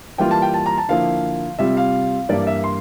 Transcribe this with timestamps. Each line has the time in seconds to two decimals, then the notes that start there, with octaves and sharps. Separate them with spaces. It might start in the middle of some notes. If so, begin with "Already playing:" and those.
0.18 E3 G3 A#3 F4 G5
0.31 A5
0.42 G5
0.54 A5
0.66 A#5
0.78 A5
0.88 D3 F3 A#3 E4 F5
1.59 C3 G3 C4 F4 E5
1.77 F5
2.29 G2 E3 G3 A#3 E4 D5
2.47 E5
2.64 C6